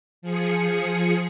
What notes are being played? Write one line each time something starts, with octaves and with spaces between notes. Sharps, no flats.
F3 G#4 C#7